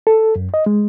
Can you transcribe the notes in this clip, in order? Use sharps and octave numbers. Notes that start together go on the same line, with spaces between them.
A4
F#2
D#5
G#3